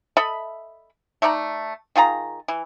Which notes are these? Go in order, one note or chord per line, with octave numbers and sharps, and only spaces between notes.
A4 D#5 E5 B5
A3 D#4 D5 A#5
D#3 F4 G#4 A#5
E3